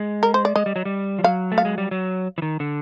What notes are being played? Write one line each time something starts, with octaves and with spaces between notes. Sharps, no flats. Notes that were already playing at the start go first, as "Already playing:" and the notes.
Already playing: G#3
A#4
C5
D5
G#3 D#5
G3
F#3
G3
F3
F#3 F5
A3
F5
G#3
G3
F#3
E3
D#3
D3